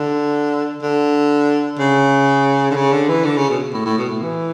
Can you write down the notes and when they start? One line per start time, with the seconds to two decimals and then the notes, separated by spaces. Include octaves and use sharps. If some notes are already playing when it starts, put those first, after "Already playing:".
Already playing: D3
0.82 D3
1.79 C#3
2.71 D3
2.76 C#3
2.93 D3
3.09 E3
3.25 D3
3.37 C#3
3.50 B2
3.74 A2
3.86 A2
3.98 B2
4.10 A2
4.22 E3